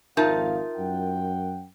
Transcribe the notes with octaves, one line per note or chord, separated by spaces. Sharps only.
G#1 F2 D#4 F4 A#4 E5 F5 A5
F#2 F#5 G5